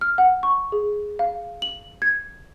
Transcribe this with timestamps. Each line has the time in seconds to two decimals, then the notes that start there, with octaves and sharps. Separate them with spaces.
0.01 F6
0.18 F#5
0.43 C#6
0.72 G#4
1.19 F5
1.62 F#7
2.02 G#6